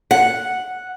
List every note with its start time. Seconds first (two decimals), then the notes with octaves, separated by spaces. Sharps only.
0.11 F#5